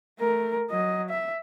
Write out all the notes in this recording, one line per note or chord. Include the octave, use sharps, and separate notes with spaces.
A3 A#4
F#3 D#5
E5